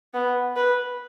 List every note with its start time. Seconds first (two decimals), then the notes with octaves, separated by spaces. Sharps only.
0.14 B3
0.56 B4